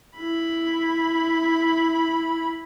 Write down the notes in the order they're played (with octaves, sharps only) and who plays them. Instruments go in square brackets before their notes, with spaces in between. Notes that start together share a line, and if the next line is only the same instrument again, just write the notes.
[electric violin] E4 B5